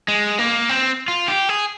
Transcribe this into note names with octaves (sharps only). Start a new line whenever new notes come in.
G#3
A#3
C4
F4
G4
G#4